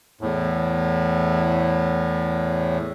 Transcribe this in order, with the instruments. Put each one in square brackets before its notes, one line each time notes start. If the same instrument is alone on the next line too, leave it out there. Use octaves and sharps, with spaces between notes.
[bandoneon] E2 A2